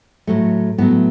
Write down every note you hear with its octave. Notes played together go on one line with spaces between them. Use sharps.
A2 F#3 A3
A2 F#3 A3 B3